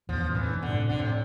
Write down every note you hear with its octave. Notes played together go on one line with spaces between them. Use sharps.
E2 G2 F3
F2 A2
E3
G2 B2
D3
A2 C3
F2 A2 D3
C3